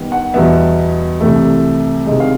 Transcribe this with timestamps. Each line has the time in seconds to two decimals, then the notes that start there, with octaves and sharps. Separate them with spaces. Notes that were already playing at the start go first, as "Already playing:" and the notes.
Already playing: D#3 G3 B3
0.12 F#5
0.34 E2 B2 G3 B3 E5
1.20 C2 C3 E3 A3
2.06 C2 C3 D#3 G#3 D#5
2.20 F5